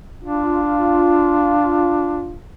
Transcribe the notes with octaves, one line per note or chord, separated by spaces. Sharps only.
D4 F4